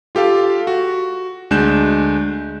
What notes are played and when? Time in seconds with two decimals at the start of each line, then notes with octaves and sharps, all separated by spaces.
0.15 F4 G4 A4 F5
0.67 F#4
1.51 D2 G#3 D4 F#6 G6 E7